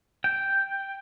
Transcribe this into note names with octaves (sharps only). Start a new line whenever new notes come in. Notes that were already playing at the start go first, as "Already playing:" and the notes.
G5